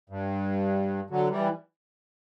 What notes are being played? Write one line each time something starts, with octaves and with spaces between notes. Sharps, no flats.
G2
D3 F#3
E3 G3